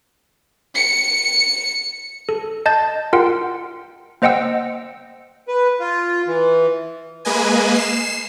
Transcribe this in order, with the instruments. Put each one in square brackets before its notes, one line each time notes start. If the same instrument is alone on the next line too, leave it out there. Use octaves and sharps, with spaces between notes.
[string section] C#7
[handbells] A4
D#5 A5 G6 A6
F4 A#4 F#5 G5
A#3 C5 D#5 F#5 G5 E6
[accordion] B4
F4
E3
[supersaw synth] G#3 A#3 B4 D#5 G#5
C7 E7